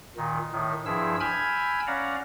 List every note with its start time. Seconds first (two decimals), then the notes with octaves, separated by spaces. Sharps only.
0.17 A#2 D#3
0.52 A2 D#3
0.86 G2 F3 E4 G#4 E6
1.20 G5 G#5 B5 E6 F6 G#6
1.87 C#4 D5 F5 F#5 A#5